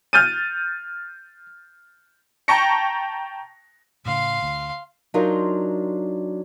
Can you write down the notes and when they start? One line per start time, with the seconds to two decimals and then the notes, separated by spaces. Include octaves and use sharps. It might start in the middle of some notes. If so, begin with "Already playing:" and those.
0.13 F6 G6 A6 D#7
2.48 G5 A5 A#5 C#6 A#6 C#7
4.05 A2 C#3 A3 F5 C6
4.42 D2
5.14 F#3 D4 D#4 F4 A#4 C5